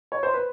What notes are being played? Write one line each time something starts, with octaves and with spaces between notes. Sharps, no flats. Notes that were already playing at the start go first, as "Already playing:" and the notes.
C#5
C5
B4